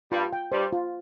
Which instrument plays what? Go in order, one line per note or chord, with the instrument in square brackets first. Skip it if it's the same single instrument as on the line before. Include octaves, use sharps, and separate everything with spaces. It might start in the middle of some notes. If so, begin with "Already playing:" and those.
[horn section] G2 G3 [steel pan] F4
[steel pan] G5
[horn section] G2 G3 [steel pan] C5
[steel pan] F4